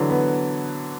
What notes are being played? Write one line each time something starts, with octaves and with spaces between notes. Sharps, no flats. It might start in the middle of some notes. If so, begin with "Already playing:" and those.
Already playing: D3 E3 F#3
B3